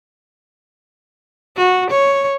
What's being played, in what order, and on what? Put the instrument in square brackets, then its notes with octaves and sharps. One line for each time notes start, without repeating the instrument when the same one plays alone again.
[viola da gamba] F#4
C#5